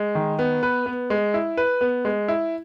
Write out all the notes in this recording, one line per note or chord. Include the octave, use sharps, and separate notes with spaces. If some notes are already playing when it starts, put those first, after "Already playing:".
Already playing: G#3
D#3
B3
B4
B3
G#3
E4
B4
B3
G#3
E4